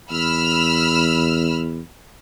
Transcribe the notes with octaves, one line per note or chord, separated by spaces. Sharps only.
E2 B5 E6 F6